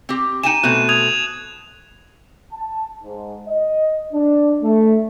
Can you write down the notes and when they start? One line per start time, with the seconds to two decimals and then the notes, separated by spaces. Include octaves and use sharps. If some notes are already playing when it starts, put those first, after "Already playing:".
0.09 C4 G4
0.44 D#4 G5 G#5 D#7 E7
0.64 B2 A3 C4 F#6
0.89 D#6 G#6 F7
2.53 A5
3.04 G#2
3.47 D#5
4.13 D4
4.63 A3